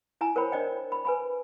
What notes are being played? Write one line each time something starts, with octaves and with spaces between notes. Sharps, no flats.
E4 G#5 A#5
A#4 C5 C#5 G5 B5
D4 C5 D5 D#5 G5
B5
B4 G#5 B5